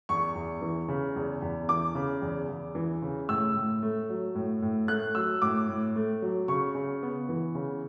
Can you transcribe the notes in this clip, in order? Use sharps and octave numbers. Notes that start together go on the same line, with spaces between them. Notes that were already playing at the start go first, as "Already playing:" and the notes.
E2 C#6
E2
E3
C#3
E2
E2
E3 D6
C#3
E2
E2
E3
C#3
A2 E6
A2
A3
F#3
A2
A2
A3 F#6
F#3 E6
A2 D6
A2
A3
F#3
C#3 C#6
C#3
B3
E3
C#3